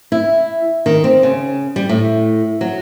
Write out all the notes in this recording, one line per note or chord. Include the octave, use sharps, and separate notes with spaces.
E4
D#3
C4
C#3
G3
A2
F#3